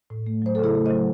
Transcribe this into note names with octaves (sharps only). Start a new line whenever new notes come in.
A2
A3
F#3 C5
A4
C#3 E4 G#4
A3
C5 D#5
F#3